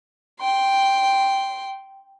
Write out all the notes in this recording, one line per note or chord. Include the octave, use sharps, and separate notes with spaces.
G5 C6